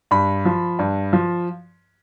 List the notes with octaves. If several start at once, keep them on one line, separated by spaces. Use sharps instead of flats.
G2 B5
F3
G2
F3